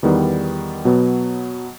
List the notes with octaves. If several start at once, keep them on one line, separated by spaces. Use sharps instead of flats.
E2 D#3 G3 B3
B2 F#3 B3